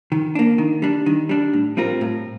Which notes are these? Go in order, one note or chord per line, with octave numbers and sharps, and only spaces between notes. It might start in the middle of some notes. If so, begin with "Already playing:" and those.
D#3
A#3 D4
D#3
G3 D4
D#3
G3 D4
A2
G3 C4 F4 A#4
A2